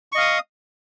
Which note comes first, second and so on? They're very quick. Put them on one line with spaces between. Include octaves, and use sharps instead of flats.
C#6 D#5 F5 D#6